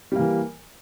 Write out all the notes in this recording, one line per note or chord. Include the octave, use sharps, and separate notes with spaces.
E3 G3 A#3